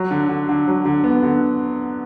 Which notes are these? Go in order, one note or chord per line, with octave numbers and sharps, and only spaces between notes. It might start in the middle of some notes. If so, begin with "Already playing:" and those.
Already playing: F#3
D3
D3
D3
F#3
D3
B3
D3